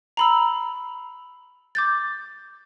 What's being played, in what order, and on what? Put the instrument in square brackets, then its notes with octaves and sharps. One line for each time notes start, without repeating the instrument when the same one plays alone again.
[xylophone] A#5 B5 E6
D6 G6 A6